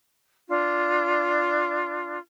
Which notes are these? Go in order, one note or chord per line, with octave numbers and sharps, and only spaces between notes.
D4 F4